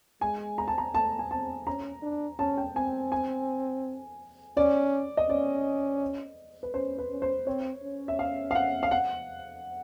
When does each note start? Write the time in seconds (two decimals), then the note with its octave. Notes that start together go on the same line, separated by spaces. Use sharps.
0.21 G#3 G#5
0.58 A#5
0.68 A5
0.78 A#5
0.94 A3 A5
1.19 G#5
1.31 C4 A5
1.67 C#4 A#5
2.03 D4
2.39 C#4 A5
2.57 G5
2.76 C4 G#5
3.12 G#5
4.57 C#4 D5
5.17 D#5
5.29 C#4 D5
6.63 B4
6.74 C#4 C5
6.98 B4
7.10 C#4
7.22 C5
7.47 C4 C#5
7.83 C#4
8.08 E5
8.19 F5
8.51 F5
8.55 F#5
8.83 F5
8.91 F#5